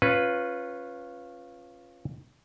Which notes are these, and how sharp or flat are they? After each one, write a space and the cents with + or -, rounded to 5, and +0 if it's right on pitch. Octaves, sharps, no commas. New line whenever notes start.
C#4 -20 F4 +0 B4 +0